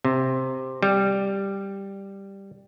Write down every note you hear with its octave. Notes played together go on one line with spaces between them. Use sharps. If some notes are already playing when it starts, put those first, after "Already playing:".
C3
G3